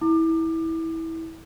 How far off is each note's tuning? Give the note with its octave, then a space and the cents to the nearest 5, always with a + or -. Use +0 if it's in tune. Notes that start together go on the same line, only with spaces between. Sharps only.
E4 -20 D6 +30